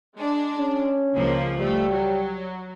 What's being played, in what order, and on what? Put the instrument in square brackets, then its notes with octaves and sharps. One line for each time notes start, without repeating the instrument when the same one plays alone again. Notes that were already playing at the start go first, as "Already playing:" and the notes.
[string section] G#3 D4
[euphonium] C#4
[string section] C#2 F3 A#3
[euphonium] G3 [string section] A3
[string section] F#3